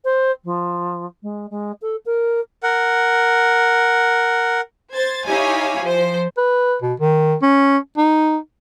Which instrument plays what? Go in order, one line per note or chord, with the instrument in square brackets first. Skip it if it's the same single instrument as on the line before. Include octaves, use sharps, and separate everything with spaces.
[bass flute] C5
F3
G#3
G#3
A4
A#4
[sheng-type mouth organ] A#4 F#5
[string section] C5 G#6 A6
D#4 E4 G4 C#5 F5 G#5
F3 C5
[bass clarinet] B4
B2
D#3
C#4
D#4